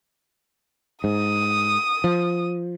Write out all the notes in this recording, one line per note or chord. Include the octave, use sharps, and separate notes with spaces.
G#2 D#6
F3